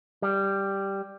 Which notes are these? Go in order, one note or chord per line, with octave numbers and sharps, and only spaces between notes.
G3